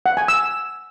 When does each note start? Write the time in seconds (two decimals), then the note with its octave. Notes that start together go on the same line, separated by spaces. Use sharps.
0.06 F#5
0.17 G#5
0.28 E6